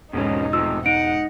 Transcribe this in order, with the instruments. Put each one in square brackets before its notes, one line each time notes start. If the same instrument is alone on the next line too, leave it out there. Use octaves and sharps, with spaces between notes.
[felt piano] E1 G#2 [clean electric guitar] F2 B2 C#4 [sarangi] D#4
[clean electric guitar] C3 F3 [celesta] E6
[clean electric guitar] D#4 [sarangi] F#5 [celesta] D7